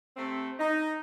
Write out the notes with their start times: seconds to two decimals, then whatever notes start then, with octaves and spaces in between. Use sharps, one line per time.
0.17 C3 A3 C4
0.59 D#4